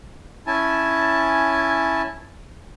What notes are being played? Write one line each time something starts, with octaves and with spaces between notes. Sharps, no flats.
C#4 E4 G#5 A5